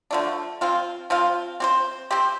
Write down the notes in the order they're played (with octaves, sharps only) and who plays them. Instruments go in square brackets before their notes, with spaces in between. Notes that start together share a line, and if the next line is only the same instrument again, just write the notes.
[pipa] D3 F3 A3 D4
F3 C4 F4
F3 C4 F4
C4 G4 C5
C4 G4 C5